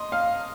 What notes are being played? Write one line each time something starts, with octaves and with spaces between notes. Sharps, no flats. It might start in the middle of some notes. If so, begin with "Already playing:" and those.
Already playing: D#5 C6
F5